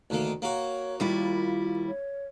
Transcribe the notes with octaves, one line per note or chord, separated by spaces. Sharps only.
D2 D#3 A#3
A#3 F#4 C#5
D#2 G3 E4 F4
C#5